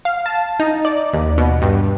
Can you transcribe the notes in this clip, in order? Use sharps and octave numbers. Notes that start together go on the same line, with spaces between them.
F5
A5
D#4
D5
D#2
B2
G2